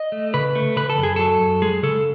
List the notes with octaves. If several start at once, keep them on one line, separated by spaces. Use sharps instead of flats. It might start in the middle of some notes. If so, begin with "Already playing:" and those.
Already playing: D#5
A3
C#3 B4
A3
C#3 B4
A4
F#2
G#4
F#3 A4
F#2
G#3 G#4
C#3 A4